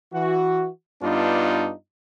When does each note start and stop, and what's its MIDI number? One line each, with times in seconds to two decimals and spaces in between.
0.13 0.68 52
0.13 0.68 66
1.02 1.72 43
1.02 1.72 59
1.02 1.72 62
1.02 1.72 63
1.02 1.72 65